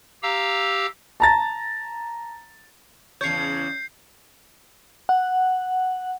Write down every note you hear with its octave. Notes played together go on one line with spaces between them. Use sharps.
G4 F5 A#5 E6
A5 A#5 A6
E2 C#3 C#5 G6 C7
F#5